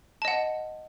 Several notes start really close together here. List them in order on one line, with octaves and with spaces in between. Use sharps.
A5 D#5 F#5